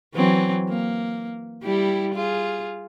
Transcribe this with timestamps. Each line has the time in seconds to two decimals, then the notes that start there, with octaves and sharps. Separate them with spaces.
0.15 E3 F#3 C4
0.69 A#3
1.64 G3 E4 G4
2.14 F4 G#4